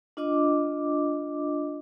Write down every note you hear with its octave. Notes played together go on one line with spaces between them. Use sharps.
D4 F4 D#5 D6